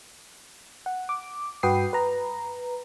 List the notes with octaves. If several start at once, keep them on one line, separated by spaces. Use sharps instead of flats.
F#5
D6
G2 F#4 B4 G5 D#6 C7
B4 A#5